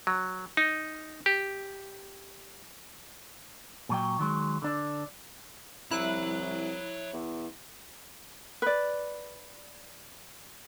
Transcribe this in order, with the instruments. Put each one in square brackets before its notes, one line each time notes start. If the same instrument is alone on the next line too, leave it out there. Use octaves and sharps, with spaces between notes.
[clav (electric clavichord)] F#3
D#4
G4
[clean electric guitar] A#2 F#3 G5
D#3 F#3 G#3
D3 D4
[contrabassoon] C2 [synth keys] E4 F#6 [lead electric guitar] C#5 A#5
[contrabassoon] E2
[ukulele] B4 D5